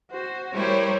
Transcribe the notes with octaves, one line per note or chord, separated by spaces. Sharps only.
F#4 C5
G3 E4 A#4 C5 C#5